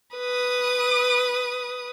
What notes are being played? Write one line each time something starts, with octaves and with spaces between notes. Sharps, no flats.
B4 D#6